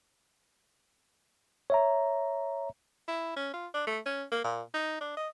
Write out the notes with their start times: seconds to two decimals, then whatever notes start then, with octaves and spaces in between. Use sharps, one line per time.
1.70 C#5 E5 A#5
3.08 E4
3.37 C#4
3.54 F4
3.74 D4
3.87 A3
4.06 C#4
4.32 A#3
4.44 A#2
4.74 D#4
5.01 D4
5.17 D#5